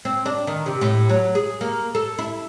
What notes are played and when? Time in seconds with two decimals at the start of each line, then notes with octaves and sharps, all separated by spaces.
0.05 C4
0.26 D4
0.47 D#3
0.66 C3
0.81 A2
1.09 F#3
1.35 G#4
1.61 A#3
1.95 A4
2.19 E4